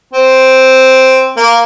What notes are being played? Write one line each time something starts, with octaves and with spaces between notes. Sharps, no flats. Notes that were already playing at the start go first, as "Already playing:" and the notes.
C4
A#3